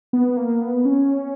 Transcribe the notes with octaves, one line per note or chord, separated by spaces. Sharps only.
B3
A#3
B3
C#4